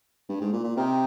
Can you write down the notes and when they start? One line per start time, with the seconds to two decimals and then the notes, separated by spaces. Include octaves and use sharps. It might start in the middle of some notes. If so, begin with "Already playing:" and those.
0.29 G2
0.41 G#2
0.53 A#2
0.64 A#2
0.76 C3 C4 D#4 A#4 D#5 G5